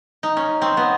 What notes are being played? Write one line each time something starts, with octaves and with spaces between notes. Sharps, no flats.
D#4
C#4
C4
B3